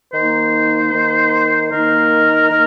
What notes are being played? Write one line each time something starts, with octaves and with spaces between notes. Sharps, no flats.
D#3 A#3 D#4 C5
D#3 A#3 D#4
D#3 A#3 D#4 A#4
D#3 A#3 D#4